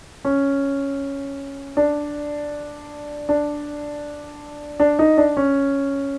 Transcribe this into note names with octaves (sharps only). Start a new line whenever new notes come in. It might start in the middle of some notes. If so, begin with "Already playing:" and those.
C#4
D4
D4
D4
D#4
D4
C#4